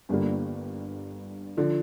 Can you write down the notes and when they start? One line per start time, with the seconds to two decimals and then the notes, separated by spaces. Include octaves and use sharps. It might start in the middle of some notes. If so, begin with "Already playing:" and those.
0.09 G1 G2 D3 G3 A#3
1.57 D3 F3